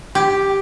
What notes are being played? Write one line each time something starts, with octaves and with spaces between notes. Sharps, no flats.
G4